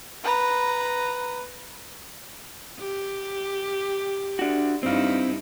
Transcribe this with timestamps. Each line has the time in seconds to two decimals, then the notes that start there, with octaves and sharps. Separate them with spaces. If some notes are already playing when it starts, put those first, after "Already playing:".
0.23 B4 A#5
2.79 G4
4.39 D4 F#4
4.83 G2 C4 D#4 E4 F5